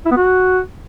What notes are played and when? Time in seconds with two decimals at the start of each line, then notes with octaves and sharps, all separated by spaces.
0.06 E4
0.11 B3
0.16 F#4